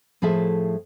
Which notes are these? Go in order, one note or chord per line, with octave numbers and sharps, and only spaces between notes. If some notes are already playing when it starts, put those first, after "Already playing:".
A2 F3 G#4 A4 E5